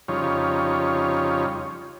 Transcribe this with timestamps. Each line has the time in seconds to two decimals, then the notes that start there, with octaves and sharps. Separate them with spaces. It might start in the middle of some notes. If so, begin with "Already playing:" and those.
0.08 F2 C#3 G3 D#4 F4 C#5